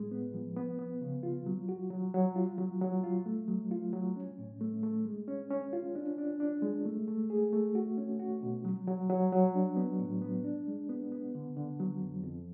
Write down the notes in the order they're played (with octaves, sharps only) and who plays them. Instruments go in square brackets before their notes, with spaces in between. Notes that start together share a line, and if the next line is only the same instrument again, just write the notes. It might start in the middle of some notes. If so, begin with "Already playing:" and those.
Already playing: [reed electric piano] A2 G#3
B3
F3
B3
B3
C#3
F4
F#3
F#4
F#3
F#3
F4
F#3
F#3
F4
A3
F#3
F4
F#3
C#4
A2
A3
A3
G#3
C#4
C#4
F4
D4
D4
D4
G#3
A3
A3
G#4
A3
F#4
C#4
F#4
B2
F#3
F#3
F#3
F#3
D4
B3
A2
B3
D4
G#3
B3
B3
D3
D3
F#3
F2
F2